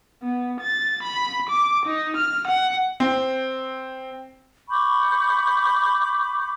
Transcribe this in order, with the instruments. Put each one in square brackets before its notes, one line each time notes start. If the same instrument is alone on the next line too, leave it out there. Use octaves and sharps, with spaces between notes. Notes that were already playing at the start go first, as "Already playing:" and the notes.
[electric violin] B3
A6
B5
D6
D#4
F6
F#5
[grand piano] C4
[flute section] B5 C#6 D6 G6